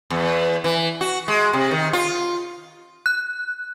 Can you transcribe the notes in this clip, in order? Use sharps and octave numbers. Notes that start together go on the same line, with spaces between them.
E2
E3
F#4
G#3
C3
D#3
F4
F#6